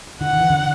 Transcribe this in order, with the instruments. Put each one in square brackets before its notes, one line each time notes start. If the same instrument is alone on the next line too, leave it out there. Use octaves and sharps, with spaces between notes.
[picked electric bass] D3 [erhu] F#5
[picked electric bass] D#3
E3
D3